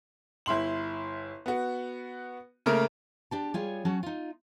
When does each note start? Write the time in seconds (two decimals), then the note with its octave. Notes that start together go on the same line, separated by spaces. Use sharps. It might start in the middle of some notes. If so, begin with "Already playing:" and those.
0.46 G1 E4 C6 F#7
1.46 B3 F#4
2.66 C#3 A3 A#3 A#4
3.31 D4 G4 A5
3.54 G3 F4 G#4 C#5
3.85 F#3 C#4 F#4 A5
4.03 D#4 F4